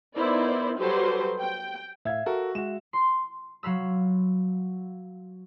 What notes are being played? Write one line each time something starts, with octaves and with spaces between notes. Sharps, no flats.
B3 D#4 E4 A#4 C5 D5
F#3 G3 G4 A4 B4 C5
G5
A2 E5 F5 G#6
F#4 A4 A#4
G#3 F#4 E7
C6
F#3 F5 B5 E6